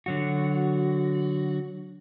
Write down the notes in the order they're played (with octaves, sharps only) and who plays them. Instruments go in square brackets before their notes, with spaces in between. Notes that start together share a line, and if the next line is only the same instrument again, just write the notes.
[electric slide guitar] D3 F#3 F#4